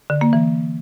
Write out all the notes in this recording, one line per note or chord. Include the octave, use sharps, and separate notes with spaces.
D3
A#3
E3